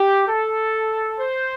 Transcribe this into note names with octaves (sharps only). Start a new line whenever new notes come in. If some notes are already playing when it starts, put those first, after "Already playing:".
Already playing: G4
A4
C5